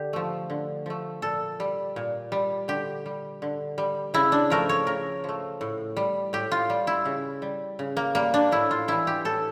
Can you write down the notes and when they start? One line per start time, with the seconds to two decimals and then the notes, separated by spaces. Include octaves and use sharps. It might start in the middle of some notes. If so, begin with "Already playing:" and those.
Already playing: D3 G4
0.13 F3 A3
0.50 D3
0.86 F3 A3
1.22 A#2 A4
1.60 G3
1.96 A#2
2.32 G3
2.68 D3 G4
3.06 G3
3.42 D3
3.78 G3
4.14 C#3 E4
4.32 D4
4.50 F3 A3 A#4
4.69 C#5
4.87 C#3 A#4
5.24 F3 A3
5.61 A2
5.96 G3
6.33 A2 G4
6.52 F4
6.70 G3
6.87 E4
7.05 C#3
7.42 G3
7.79 C#3
7.97 A#3
8.15 G3 A#3
8.34 D4
8.52 A2 E4
8.71 F4
8.88 E3 G3 E4
9.07 G4
9.25 A2 A4